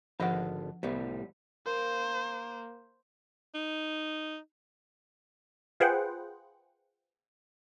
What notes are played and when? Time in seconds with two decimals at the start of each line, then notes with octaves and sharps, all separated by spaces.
0.20 G#1 D3 F3 B3 D#5 F5 F#5
0.83 C2 A2 G3 B3
1.66 A#3 C5
3.55 D#4
5.80 F4 G#4 B4 C5 F#5 G5